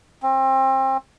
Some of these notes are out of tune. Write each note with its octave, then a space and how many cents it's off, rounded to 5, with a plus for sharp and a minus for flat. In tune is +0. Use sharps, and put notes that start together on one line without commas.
C4 +30